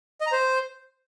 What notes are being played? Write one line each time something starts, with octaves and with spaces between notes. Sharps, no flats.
D#5
A#5
C5